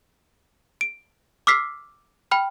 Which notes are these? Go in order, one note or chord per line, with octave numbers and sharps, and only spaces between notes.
D7
D6 E6 F6 B6 C7
G5 B5 F6